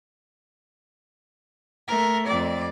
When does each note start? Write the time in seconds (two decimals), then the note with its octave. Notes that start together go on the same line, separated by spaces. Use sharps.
1.88 A3 A#4
2.26 F2 D5